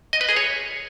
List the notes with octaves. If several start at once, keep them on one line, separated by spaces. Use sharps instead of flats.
D#5
B4
G#4
C#5